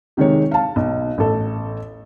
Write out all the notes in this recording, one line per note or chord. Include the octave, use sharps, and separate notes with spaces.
C3 D#3 G#3 C#5
F5 A5
B1
A1 A4